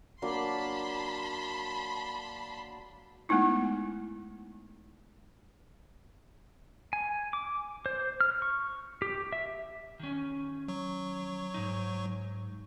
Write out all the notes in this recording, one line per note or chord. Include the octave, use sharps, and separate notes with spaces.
F#3 A#3 D4 A5 B5 C6
G#3 A3 B3 D#4 E4
G#5
D6
C5
F6
C#6
G4
E5
D#3 C#4
F#3 C#6
G#2 C3 D#4